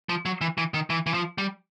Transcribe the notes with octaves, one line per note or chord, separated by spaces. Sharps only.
F3
F#3
E3
E3
D#3
E3
E3
F3
G3